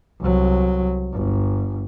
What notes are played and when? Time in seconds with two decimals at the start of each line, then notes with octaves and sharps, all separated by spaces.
0.21 C2 F#3
1.13 G1